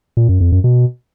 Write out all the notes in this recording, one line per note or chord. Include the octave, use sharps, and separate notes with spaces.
A#2
F#2
F2
F#2
B2